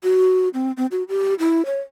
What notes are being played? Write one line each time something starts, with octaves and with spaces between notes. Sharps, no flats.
F#4
C4
C4
F#4
G4
E4
C#5